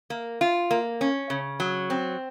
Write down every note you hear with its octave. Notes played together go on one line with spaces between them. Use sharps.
A#3
F4
A#3
C#4
C#3
F#3
C4